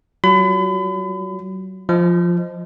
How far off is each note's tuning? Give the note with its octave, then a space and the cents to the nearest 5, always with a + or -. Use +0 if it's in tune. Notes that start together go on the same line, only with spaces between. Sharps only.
F#3 +30 F4 +20 B5 +35
F3 +0 D#5 +0